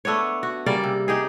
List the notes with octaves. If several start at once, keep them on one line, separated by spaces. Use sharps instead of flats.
A3 B3 D4 C#5
F#4
C#3 G3 A#3 D5
C3
D#4 G4 G#4